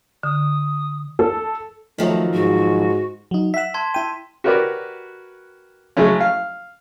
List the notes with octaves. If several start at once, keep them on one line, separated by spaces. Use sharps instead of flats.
D3 D#6
A4
D#3 F3 F#3 A3
G#2 F#4
F#3 D#4
E5 F#5 B6 E7
A5 C6 G#6
E4 G5 D#7
F#4 G4 A#4 B4 C#5 D5
C#3 F#3 G#3 A3 C#4
F5